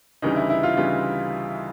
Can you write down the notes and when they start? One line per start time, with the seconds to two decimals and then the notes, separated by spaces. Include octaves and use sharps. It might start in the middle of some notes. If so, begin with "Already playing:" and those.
0.22 D2 C#3 E3 G3 D#4
0.36 E4
0.50 E4
0.63 F4
0.76 D2 C#3 E3 G3 F4